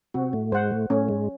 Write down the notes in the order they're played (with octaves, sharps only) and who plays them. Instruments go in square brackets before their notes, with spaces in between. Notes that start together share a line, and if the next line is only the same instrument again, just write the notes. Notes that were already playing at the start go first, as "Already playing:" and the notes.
[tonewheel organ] C3 C4 [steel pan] F#4
[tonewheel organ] A2 A3
[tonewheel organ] G#2 G#3 [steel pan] C5 F#5
[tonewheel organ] A2 A3
[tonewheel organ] A2 A3 [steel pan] C#4
[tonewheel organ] G#2 G#3